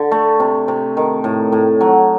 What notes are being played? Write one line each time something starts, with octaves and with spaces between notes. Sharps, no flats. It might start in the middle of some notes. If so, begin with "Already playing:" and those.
Already playing: D3
A3
C3
C3
D#3
A2
A2
F#3